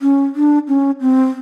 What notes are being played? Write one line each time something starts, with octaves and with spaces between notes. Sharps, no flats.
C#4
D4
C#4
C4